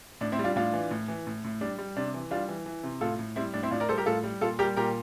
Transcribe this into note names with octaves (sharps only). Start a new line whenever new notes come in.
A2 D4
C4 E4
G3
D4 F4
A2 D4 F4
E3
A2
E3
A2
A2
G3 D4
G3
C3 D4
E3
G3 D4 F4
E3
E3
C3
A2 F4 A4
A2
G3 C4 E4
A2 D4
C4 E4
A2 D4 F4
A#4 D5
G3 A4 C5
G4 A#4
A2 F4 A4
G3
A#2 F4 A4
G3 G4 A#4
A#2 G4 A#4